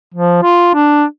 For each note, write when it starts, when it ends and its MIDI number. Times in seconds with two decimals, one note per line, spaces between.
0.14 0.41 53
0.43 0.71 65
0.74 1.04 62